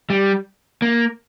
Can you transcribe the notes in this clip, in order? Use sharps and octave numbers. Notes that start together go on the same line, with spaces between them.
G3
A#3